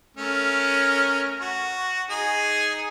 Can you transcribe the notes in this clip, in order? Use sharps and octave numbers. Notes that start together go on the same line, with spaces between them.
A3 C#4 A#4
F#4
D#4 G#4 G#5